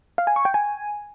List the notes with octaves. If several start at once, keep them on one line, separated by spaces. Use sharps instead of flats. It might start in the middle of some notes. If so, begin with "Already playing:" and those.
F5
G#5
C#6
G5
G#5